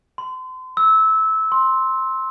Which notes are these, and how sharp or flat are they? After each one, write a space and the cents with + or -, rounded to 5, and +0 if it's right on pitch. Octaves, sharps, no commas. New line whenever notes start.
C6 -35
E6 -20
C6 +5